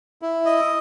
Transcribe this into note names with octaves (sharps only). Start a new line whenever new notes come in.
E4
D#5